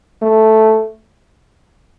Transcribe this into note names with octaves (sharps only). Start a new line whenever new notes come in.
A3